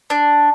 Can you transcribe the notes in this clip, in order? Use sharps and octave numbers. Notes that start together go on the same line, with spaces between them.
D4